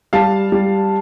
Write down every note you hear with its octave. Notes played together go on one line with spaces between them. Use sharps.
G3 F5 A5
G3